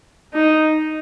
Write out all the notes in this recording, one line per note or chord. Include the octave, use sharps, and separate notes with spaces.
D#4